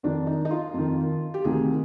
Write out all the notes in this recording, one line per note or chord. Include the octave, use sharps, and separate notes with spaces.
F2 D#3 D4
D#4
D#4
F4
F2 D#3
G4
D2 C3 D#3 G#4